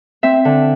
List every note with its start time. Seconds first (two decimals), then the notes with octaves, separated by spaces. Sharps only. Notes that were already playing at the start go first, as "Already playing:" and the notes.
0.23 C4 E5
0.45 D3